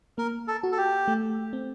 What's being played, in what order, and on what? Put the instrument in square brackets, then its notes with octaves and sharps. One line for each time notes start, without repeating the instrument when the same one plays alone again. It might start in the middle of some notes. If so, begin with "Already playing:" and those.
[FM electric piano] A#3 [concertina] A#4
[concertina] A4
[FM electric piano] F#4
[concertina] A4
G4
[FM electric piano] A3
C4